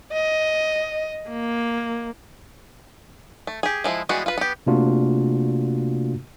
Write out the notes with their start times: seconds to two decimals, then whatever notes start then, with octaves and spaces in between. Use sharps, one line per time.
0.13 D#5
1.29 A#3
3.47 A3
3.63 G4 G#4
3.84 F3 G#3 E4
4.09 E3 G3 G#3 B3 F#4
4.26 F4 B4
4.38 B3 G4
4.67 C3 A3 A#3 D4 F4 F#4